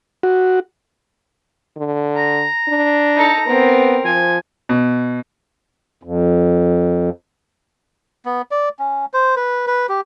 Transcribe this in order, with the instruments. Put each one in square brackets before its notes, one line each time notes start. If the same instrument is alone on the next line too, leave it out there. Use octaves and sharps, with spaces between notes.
[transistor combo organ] F#4
[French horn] D3
[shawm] A#5
[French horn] D4
[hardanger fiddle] D#4 A4
[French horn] B3 [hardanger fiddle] C4 A#4
[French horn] F3 [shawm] G#5
[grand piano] B2
[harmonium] F2
[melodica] B3
D5
C#4
C5
B4
B4
G4